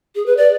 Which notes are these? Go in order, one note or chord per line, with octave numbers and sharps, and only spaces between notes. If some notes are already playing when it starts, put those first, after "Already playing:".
G#4
B4
D5